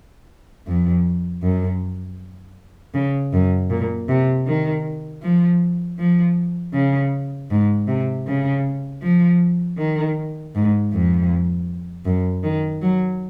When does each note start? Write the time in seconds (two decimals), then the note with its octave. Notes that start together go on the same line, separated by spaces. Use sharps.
0.67 F2
1.43 F#2
2.94 C#3
3.33 F#2
3.71 A#2
4.09 C3
4.46 D#3
5.23 F3
5.99 F3
6.74 C#3
7.51 G#2
7.88 C3
8.27 C#3
9.02 F3
9.78 D#3
10.55 G#2
10.93 F2
12.05 F#2
12.43 D#3
12.82 F#3